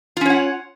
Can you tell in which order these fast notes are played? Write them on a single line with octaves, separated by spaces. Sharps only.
F4 C#4 C#5 F#5